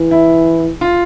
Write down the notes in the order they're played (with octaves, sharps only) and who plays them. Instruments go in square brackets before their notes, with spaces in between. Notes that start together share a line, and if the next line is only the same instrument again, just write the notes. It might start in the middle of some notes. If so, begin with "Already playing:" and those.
Already playing: [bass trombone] E3
[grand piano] E4
F4